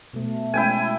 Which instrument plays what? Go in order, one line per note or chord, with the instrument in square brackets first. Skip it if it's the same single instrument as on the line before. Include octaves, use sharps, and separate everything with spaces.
[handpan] B2 A3
[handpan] G#3 A3 C#4 [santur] E4 G5 G#5